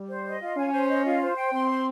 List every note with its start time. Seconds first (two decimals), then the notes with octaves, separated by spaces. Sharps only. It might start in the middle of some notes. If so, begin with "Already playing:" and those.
Already playing: G3
0.09 C5
0.25 D#5
0.41 F4
0.57 C#4 G#5
0.72 C5
0.88 D#5
1.05 F4
1.21 C5
1.36 G5
1.53 C4 C6
1.69 C5